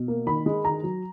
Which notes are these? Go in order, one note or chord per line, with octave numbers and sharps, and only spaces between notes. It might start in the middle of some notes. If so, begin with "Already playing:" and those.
Already playing: B2
A#3
D#3 B5
G#3
D#3 A#5
F#3